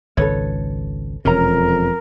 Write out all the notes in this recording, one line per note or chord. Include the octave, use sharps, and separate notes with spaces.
G#1 C#2 A4 B4 C#5
E1 F2 C3 C#4 A#4 A#5